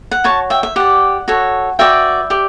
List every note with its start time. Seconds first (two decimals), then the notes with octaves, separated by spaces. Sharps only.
0.11 F#5
0.24 F#4 C#5 A5 C#6
0.50 E5 G5
0.63 E5
0.76 G4 D5 F#5
1.28 F#4 A4 C#5
1.79 F#4 B4 D5 E5 G5
2.30 G4 D5